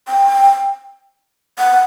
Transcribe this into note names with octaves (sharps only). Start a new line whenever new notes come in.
G5
F#5